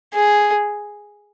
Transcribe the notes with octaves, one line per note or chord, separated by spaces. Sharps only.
G#4